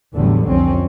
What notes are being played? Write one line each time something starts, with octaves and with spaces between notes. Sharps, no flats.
A1 E2 D3 F#3 G3 A3
C2 F2 C4 C#4